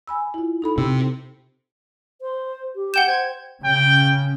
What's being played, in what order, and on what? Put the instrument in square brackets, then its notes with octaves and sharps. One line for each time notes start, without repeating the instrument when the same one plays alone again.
[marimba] G#5 B5 E6
E4 F4
D#4 A4 B5
[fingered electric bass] C3 [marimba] E6
[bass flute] C5
G4
[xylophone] F#5 G5 E7 [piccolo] G6
[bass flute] C5 [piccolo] G#6
[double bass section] C#3 [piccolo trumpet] G5